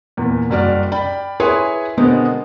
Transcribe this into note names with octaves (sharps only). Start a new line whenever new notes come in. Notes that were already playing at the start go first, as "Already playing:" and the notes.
E2 A#2
F#1 G3 F#4 D5 F6
D5 G5 B5
E4 G#4 B4 C#5 G#5 C6
B2 D3 G#3 B3 C4 A#4